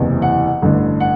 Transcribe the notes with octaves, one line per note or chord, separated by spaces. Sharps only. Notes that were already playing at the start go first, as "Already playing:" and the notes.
Already playing: F#1 E2 C3 E3
F#5
A1 G2 D3
F#5